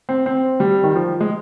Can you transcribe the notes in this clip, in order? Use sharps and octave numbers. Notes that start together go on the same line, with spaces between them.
C4
C4
G3
D#3
F3
G#3